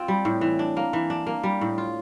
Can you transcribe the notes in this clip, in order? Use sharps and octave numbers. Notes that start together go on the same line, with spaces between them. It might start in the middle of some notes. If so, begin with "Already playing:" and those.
Already playing: C4 F4
G3
A2
E3
D4
A#3
E3
D4
A#3
G3
A2
F4